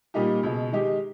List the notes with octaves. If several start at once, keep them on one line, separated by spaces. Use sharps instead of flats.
A#2 G3 A#3 D#4 G4
C#2 B2 G#3
D#3 G#3 D#4 G4